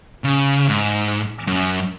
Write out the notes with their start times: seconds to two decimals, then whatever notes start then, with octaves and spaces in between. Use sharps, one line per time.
0.24 C#3
0.69 G#2
1.47 F#2